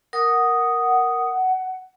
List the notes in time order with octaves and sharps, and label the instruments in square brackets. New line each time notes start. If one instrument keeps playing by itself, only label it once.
[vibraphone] A#4 D#6 [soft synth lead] F#5